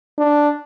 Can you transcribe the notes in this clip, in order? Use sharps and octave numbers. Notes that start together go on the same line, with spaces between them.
D4